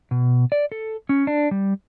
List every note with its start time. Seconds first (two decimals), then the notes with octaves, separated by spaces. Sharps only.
0.11 B2
0.52 D5
0.72 A4
1.09 C#4
1.27 D4
1.51 G3